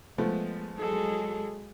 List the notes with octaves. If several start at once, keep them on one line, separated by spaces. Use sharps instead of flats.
F3 G#3 A3 B3
F#3 G#3 G#4 A4